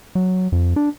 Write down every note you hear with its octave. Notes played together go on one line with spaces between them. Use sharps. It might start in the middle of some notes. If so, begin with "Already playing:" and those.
F#3
F2
D4